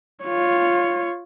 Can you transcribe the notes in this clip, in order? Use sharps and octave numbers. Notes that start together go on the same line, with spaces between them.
F4 C#5